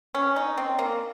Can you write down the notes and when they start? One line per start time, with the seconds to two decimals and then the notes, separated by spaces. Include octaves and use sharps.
0.15 C#4
0.36 D#4
0.57 C4
0.78 A#3